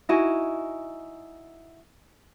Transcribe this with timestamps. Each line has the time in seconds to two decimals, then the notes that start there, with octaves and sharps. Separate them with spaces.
0.09 D#4 E4 F#4 G#5